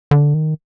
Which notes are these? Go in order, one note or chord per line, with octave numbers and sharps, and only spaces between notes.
D3
D#3